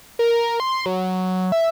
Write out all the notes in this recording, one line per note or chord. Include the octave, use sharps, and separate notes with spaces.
A#4
C6
F#3
E5